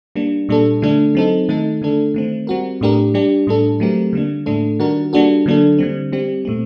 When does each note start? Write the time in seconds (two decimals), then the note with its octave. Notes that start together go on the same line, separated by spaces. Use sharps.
0.16 G3 A#3 D4
0.49 A#2 G3 D4 A4
0.82 D3 A3 D4 A4
1.15 F#3 C4 D#4 A4
1.49 D#3 A3 D#4 A4
1.82 D3 A3 D4 A4
2.14 D#3 A3 C4
2.47 G3 C4 F#4 A#4
2.81 A2 A3 D4 G4 A#4
3.14 G3 D4 G4
3.47 A2 G3 D4 A4
3.80 F#3 A3 C4 G4 A#4
4.13 D3 G3 A#3 D4
4.46 A2 A3 D4 A4
4.79 D#3 G3 D4 F#4 A#4
5.13 G3 A#3 D4 F#4 A4
5.46 D3 F#3 A#3 D4 A4
5.79 D3 G3 C4
6.12 G3 C4 G4
6.45 A#2 A3 C4